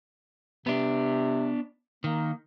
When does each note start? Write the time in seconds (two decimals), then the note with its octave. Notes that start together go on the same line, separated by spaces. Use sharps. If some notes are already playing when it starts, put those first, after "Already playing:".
0.67 C3 B3 D4
2.04 D#3 A#3